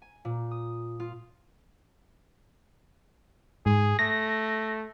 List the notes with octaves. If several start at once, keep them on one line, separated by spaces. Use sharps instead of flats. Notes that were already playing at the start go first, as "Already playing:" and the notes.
G#5
A#2
D#6
F4
G#2 G#4
A3 A#6